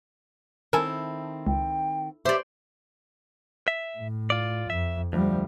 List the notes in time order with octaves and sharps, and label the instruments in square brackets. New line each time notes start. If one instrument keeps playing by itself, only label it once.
[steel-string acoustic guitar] D#3 C4 [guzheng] E4 A4 [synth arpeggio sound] A#4 G#5
[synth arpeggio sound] C#2 [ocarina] G5
[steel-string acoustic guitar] G4 E5 [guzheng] C5 D5 [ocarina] D6
[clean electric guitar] E5
[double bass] A2
[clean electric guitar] F4 D5
[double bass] F2 [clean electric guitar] E5
[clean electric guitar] D2 [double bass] F3 G3